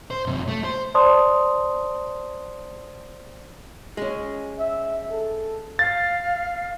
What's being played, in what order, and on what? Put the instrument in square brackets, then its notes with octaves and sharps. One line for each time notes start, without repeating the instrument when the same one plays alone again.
[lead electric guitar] C5
F#2 C3
A3
C5
[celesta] C5 D5 A5 C6 D#6
[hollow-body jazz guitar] G#3 C#4
[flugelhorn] E5
A4
[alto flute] F5 [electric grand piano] A6